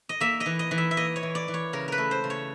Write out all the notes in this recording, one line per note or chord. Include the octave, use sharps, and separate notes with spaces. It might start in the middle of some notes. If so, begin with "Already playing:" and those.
D#5
A#3 E5
D#5
E3
D#5
E3
E5
E5
A#3 D#5
C#5
E3
D5
E3
C#5
C#3 A#4
A#4 B4
A3
C5
C#3
C#5